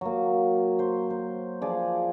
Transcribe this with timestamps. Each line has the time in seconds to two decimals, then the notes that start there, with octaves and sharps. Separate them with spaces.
0.01 F#3 A#3
0.79 C5
1.10 C5
1.62 F3 G#4 D5